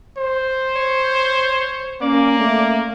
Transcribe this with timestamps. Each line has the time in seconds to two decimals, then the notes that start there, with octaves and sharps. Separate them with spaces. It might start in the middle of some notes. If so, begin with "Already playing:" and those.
0.18 C5
0.76 C#5
2.02 A#3 C#4 D5
2.39 A3